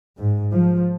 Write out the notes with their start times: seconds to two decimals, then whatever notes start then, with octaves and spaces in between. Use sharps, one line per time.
0.18 G#2
0.54 F3